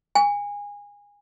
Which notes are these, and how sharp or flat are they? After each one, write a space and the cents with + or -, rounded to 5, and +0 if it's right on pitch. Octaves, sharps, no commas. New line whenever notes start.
G#5 -25